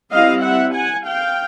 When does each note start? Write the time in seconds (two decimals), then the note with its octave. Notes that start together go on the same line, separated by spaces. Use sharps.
0.12 G3 C4 E4 D#5 F5
0.43 E5 F#5
0.74 F#5 G#5
1.06 F5 G5